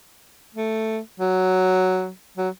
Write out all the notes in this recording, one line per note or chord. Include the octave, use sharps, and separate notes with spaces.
A3
F#3
F#3